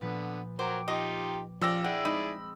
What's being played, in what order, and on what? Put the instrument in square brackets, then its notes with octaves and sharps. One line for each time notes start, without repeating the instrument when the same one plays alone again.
[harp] A#2 F3 B4 [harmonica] D3 B3
[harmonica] F#3 A#4 [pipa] C5 [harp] G5 D6
[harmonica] D#4 F4 G4 [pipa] D#5
[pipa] C#3 G4 [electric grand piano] F3 E6 A#6 [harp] C5 F5 [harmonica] D5
[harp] D4 [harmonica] E4 G#4 D5 [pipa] F#5 [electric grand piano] G5
[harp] G#3 C4 D#5 [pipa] D#4 [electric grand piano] B5